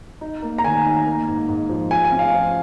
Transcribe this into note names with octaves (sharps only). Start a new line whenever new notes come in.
D#4
A#3
A#5
D#3 G#5
D#4
A#3
G#2
G#2
F3
F3 G#5
G#5
C#4
F5
F3